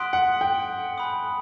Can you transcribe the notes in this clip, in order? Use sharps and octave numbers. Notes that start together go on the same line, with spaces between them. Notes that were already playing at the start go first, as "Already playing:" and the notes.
Already playing: F#5 C6 D#6 F#6 B6 D7
F#5
G5
G#5 B5 D#6